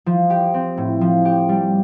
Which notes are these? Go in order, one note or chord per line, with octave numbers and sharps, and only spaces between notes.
F3
G4
C4
A2
F3
G4
G3